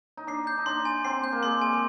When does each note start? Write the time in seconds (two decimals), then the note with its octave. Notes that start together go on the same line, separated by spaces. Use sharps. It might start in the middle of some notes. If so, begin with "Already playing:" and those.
0.17 D#4
0.27 D4 C7
0.47 G6
0.58 D#4
0.66 D4 C6
0.85 G#5
1.05 C4 C7
1.24 G6
1.32 A#3
1.43 G#3 C6
1.62 G#5
1.73 G#3